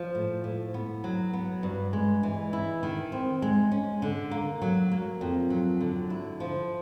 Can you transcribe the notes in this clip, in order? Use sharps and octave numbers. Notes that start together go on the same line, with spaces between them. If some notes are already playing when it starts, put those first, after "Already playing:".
Already playing: F3
A2
A2
B3
F#3
B3
G2
G#3
E3
E4
D#3
C4
G#3
C#4
D3
A#3
F#3
A#3
F2
F#3
D3
E4
F3